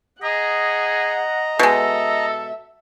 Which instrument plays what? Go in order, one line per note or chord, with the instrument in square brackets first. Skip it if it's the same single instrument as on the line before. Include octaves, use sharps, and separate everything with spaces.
[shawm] G#4 [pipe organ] D#5 A#5 [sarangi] F#5
[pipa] B2 G#3 [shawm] A4 [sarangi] E5